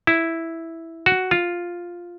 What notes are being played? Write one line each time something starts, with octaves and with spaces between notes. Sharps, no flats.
E4
F#4
F4